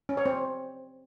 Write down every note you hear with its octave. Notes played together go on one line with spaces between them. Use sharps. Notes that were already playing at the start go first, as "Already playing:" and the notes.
C#4
C#5
C4